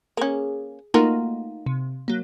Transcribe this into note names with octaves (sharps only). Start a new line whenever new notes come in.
A#3 C#4 G#4
A3 A#3 D#4 F4 F#4 A#4
C3
F#3 A#3